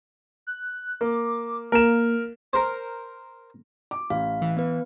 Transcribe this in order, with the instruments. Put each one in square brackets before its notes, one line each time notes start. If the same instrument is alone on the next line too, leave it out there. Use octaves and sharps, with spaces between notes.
[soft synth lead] F#6
[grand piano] A#3 [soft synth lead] D6
[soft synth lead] A#3 [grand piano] A#4 E7
[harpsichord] A#4 C5
[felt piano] D6
[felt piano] A1 [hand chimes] F5
[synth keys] E3
[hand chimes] B3 B4